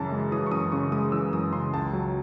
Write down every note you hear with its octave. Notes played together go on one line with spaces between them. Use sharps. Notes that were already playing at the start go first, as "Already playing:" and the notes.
Already playing: F#2 C#3 E3 A5
G#3
E3 D#6
C#6
F#2 D#6
C#3 C#6
G#3 D#6
E3 E6
F#2 D#6
C#3 C6
C#2 A5
F#3